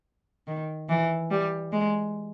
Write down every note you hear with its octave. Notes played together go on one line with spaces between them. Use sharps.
D#3
E3
G3
G#3